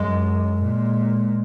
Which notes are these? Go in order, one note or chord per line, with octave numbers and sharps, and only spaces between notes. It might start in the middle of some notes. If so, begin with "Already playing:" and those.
Already playing: F#2 G#3
A#2